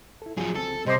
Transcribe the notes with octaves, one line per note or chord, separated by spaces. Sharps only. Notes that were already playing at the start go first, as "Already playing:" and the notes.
E4 A4
F3 F#3 G#4
C#2 C4 A4
C3 G3 C5 D#5 C6 D6